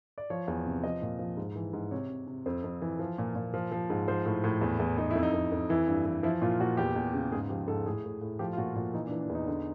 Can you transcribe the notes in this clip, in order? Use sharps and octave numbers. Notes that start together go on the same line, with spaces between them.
D5
F3 C#5
E2
C3
F3 D#5
A#2
F3
G#2
E3
G#2
C3 C#5
C3
C3
F2 C5
F2
E3
F3
A#2
A#2
F3
F3
G#2
F3 C5
A2
A2
E2
E2
E2 D#4
F2 E4
D#4
F2
F2
E3 E4
G2
E3
F3 E4
A#2 F4
A#2 F#4
E2 G4
E2
C#3
G#2 G#4
F3 G4
G#2 A4
A2 G#4
A2
A2
F3 G4
F4
A#2 F#4
A#2 F4
E3 D#4
D4
E3
D4
E2
D#4
D3